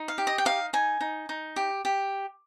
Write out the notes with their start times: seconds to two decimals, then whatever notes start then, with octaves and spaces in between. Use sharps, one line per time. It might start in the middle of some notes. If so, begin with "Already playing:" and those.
Already playing: D#4
0.08 F5
0.18 G4
0.27 D#5
0.38 G5
0.45 D#4 F5
0.73 D#4 G#5
1.01 D#4
1.29 D#4
1.56 G4
1.85 G4